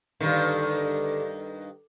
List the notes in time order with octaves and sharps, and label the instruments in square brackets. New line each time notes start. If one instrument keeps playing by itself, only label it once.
[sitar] G2 D#3 [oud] D3